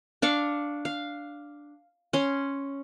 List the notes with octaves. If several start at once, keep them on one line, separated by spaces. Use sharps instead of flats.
D4 F5 C#6
F5
C#4 C6